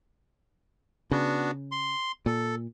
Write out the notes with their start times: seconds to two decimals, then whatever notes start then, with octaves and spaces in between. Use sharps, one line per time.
1.11 C#3 B3 D4 F#4
1.71 C6
2.26 A#2 A4